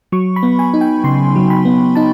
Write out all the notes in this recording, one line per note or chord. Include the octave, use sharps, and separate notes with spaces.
F#3 C#6
B5
B3
G#5
D#4
G5
C#3 C6
F#3
B5
B3
D#4 A5